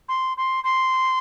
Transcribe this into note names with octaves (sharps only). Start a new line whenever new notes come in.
C6
C6
C6